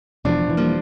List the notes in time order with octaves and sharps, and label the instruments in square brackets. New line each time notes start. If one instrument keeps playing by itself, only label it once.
[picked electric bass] E1 E2 [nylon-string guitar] B2 F3 [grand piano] D4
[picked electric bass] E1 E3
[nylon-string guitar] F3 G3 [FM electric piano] A#3